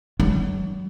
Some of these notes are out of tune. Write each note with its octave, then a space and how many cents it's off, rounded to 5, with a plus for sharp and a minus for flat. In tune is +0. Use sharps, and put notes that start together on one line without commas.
F#3 +35